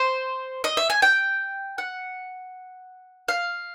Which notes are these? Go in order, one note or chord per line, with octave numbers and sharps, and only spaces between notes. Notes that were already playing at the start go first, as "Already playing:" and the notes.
Already playing: C5
D#5
E5
G#5
G5
F#5
F5